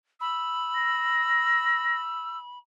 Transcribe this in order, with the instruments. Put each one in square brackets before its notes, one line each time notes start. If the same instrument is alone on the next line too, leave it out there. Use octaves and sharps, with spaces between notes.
[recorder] B5 [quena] E6
[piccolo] A#6